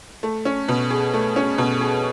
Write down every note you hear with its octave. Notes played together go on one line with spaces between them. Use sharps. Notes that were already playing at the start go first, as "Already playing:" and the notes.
A3
C#4
B2
G#4
A3
C#4
B2
G#4